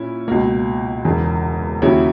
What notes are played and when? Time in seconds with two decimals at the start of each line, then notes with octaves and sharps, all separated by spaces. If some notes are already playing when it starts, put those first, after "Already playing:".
Already playing: A#2 C#4 E4
0.28 C#2 B2 A#3
1.05 E1 E2 C#3
1.82 D#2 C#3 F#3 C#4 E4